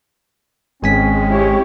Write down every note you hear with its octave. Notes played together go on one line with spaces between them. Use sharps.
G#1 G#3 C4 C#4 G#5 B6
E4 G4 C#5